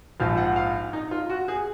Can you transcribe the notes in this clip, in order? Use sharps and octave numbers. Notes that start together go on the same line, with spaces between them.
A#1 G#2 F3 F5
F#5
F5
D#4
F4
F#4
G#4